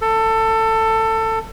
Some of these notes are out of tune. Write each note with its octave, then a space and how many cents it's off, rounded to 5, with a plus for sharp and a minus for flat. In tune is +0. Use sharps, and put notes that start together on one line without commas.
A4 +20